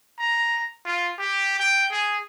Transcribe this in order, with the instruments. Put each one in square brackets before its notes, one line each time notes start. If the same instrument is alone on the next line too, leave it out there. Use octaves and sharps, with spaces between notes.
[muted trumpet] A#5
F4
G4
G5
G#4